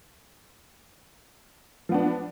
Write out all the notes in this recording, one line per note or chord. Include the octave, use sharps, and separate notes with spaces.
F3 B3 D4